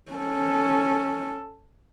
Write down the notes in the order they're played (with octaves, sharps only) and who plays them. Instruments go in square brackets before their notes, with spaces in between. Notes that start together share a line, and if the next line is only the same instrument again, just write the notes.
[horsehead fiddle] C#4 A4